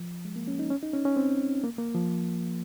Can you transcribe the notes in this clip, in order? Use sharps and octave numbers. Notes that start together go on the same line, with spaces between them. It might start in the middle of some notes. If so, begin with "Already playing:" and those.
Already playing: F3
G#3
A#3
C#4
D#4
C#4
D#4
C#4
C#4
C4
A#3
A#3
F3